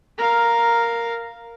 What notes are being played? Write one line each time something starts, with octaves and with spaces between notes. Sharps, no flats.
A#4 F5